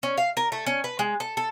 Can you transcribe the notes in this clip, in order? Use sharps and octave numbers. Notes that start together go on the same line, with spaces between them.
C#4
F5
A#4
A3
C#4
B4
G#3
A4
A4